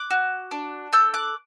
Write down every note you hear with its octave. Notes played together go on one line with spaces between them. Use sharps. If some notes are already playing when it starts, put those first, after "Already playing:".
Already playing: D6 F#6
F#4
D4
A4 E6 G6
D6 F#6